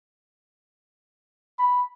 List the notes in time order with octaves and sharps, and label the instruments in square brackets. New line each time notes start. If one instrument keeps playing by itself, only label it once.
[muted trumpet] B5